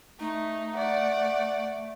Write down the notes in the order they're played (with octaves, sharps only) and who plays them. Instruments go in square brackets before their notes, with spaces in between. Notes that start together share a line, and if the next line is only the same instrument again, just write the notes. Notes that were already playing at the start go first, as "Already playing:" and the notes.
[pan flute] A3 [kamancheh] D#4
[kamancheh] D5 F#5